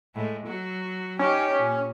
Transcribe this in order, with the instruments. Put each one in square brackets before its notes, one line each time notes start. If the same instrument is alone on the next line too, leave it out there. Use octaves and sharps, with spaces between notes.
[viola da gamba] A2 G#3
F#3 F#4
[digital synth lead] C#4 [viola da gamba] D#4 G4
[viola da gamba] A#2